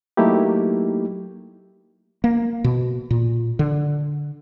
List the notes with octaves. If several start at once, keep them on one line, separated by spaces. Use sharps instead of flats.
F#3 A3 A#3 D#4 E4 G4
A#3
B2
A#2
D3